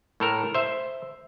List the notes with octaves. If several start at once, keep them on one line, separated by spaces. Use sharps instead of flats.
A2 A4 A#4
C5 E5